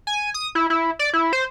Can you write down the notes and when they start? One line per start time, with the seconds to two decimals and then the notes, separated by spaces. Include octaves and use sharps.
0.07 G#5
0.34 D#6
0.55 E4
0.70 E4
0.99 D5
1.14 E4
1.33 C5